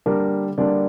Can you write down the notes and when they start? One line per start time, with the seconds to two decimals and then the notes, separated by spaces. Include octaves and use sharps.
0.06 D3 G3 A#3 D4 A#4
0.58 D3 G3 A#3 D4 D5